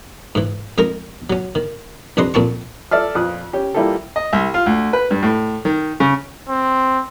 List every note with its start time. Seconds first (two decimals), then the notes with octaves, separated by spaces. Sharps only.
0.35 G#2 E3
0.78 F2 G#3 D#4 A#4 A#5
1.30 F#3 C#4
1.55 D#3
2.17 C2 F2 D4 B4 D#5 C6
2.34 F2 A#2 C4 A5 C#6
2.91 A4 D5 E5 F6
3.15 F2 A#2 F4 D#6 F#6
3.53 C#4 G4
3.74 G3 A#3 E4 F4 G4 A4
4.16 D#5
4.33 C2
4.54 F4
4.66 D2
4.93 B4
5.11 G2
5.22 A2
5.65 D#3
6.00 C#3
6.49 C4